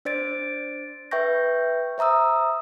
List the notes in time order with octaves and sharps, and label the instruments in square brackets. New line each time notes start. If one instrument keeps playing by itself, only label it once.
[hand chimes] D4 C5 D5 A6 D7
B4 E5 G5 C#6 G6 A#6
C5 E5 A#5 D#6 E6